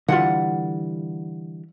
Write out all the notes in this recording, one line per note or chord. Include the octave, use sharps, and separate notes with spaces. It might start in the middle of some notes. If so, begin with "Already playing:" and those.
D3 E3 G3 F4 F#5